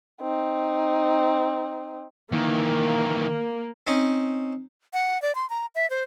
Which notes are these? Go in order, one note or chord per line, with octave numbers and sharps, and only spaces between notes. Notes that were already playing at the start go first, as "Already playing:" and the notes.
C4 D#4
D#3 E3 A#3
C4 C#4 D#4
F#5
D5
C6
A#5
E5
C5